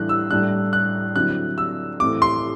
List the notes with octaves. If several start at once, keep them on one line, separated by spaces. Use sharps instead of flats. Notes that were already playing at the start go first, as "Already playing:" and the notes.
Already playing: A2 E3 G3 D4 F#6
E6
A2 G3 D4 F#6
F#6
D3 F#3 C4 E4 F#6
E6
A2 E3 A3 C4 E4 D6
C6